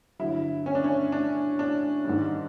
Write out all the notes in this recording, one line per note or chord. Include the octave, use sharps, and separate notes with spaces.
G2 D3 F#3 E4
C#4
D4
C#4
D4
D4
G#2 D#3 G3